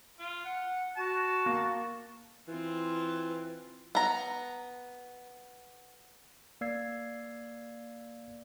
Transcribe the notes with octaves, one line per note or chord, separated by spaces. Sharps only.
F4
F#5
F#4 A5
A#3
E3 C4 F4
B3 A#5
A#3 D5 F5 E6 G#6 C7